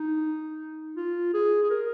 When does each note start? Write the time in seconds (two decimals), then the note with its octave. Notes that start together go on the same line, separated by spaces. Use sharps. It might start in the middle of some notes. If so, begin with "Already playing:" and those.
Already playing: D#4
0.97 F4
1.34 G#4
1.64 G#4
1.70 A#4